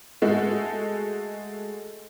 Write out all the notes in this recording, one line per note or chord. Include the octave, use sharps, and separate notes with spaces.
G#3 A3 F#4 A4